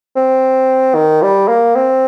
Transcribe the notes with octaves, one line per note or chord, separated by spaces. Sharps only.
C4
D#3
G3
A#3
C4